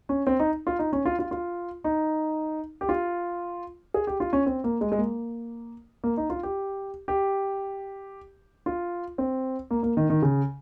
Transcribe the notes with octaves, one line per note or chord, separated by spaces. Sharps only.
C#4
C4
D#4
F4
D#4
C#4
F4
F4
F4
D#4
G4
F4
G#4
G4
F4
C#4
C4
A#3
G#3
G#3
A#3
A#3
D#4
F4
G4
G4
F4
C4
A#3
A#3
D#3
D#3
C#3